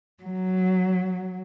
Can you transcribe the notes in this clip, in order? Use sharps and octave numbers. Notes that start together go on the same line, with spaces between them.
F#3